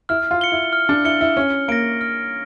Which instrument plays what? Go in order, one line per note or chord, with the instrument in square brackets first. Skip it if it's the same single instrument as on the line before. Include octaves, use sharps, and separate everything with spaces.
[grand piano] E4 [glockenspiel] F6
[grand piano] F4
[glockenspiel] C#7 G7
[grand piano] E4
[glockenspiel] F6
[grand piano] D4
[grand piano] E4 [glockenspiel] C#7 G7
[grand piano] E4
[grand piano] C#4 [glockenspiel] F6
[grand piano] A#3 [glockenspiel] A#6 D7
[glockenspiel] F6